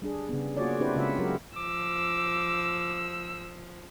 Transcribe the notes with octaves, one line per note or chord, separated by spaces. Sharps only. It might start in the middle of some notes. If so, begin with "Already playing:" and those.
G3 D4 G#4
C#3 B3
A#3 F4 F#4 G#4 C#5 D5
C4 D4 E4 G4 B4 C5
C#3 G#3 F4 C5 E5 F#5
F#3 F#4 G4 A#4
F3 D6 E6